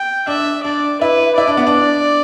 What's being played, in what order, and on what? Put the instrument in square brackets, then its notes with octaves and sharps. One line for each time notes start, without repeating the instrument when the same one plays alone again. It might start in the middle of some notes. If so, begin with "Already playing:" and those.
Already playing: [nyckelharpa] G5
[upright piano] D4 [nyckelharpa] E5
[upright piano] D4 [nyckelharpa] D5
[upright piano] E4 [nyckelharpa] B4
[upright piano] E4 [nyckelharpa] D5
[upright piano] D4
B3
D4